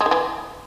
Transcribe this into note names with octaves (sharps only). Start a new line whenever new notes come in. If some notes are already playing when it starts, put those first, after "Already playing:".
G#3
D#3
E3